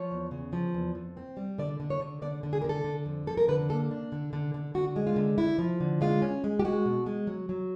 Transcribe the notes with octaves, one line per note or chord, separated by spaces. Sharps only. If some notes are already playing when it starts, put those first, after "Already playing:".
Already playing: F3 C#5
E2
C#3
F3
E2
F2
C4
G3
D3 D5
D3
C#5
D3
D3 D5
D3
G#4
D3 A#4
A4
D3
F2
F2 A4
A#4
D3 B4
A#3 A4
D4
D3
D3
D3
D3 F#4
G#3
F4
D3
D3 E4
F3
D3
G#3 F4
C#4
G#3
G4
G#3 F#4
B2
G#3
F#3
F#3